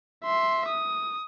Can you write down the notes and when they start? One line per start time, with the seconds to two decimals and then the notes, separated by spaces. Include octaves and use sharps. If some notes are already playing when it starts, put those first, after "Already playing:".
0.24 E5 C6
0.68 D#6